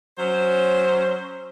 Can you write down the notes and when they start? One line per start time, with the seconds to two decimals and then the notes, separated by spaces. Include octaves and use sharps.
0.19 F#3 C#4 C5